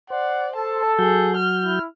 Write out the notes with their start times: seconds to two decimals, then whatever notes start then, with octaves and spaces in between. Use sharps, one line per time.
0.10 C5 D5 F#5
0.56 A4 A5
0.99 F#3 F#4 G#4 G6
1.36 F6
1.64 E4